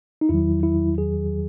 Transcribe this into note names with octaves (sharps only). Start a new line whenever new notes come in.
D#4
E2 D#3 F#3 E4
E4
G#4